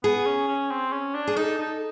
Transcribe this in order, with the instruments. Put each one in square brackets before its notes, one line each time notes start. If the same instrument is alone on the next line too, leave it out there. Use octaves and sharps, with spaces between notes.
[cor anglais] B3 [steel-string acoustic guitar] G#4
[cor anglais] C#4
C#4
C4
C#4
D4
[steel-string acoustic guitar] G#4
[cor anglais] D#4 [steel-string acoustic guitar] A4
[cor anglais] D#4